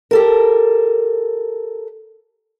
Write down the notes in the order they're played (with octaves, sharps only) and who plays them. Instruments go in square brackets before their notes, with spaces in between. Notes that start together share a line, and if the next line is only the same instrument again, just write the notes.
[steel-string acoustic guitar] G4 A4 A#4